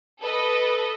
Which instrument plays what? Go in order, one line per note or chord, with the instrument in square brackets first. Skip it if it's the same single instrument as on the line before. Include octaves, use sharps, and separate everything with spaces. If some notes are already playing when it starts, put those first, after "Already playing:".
[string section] A4 B4 D#5